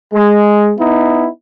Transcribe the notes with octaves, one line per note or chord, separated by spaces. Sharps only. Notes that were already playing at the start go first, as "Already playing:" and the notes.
G#3
B3 D#4 E4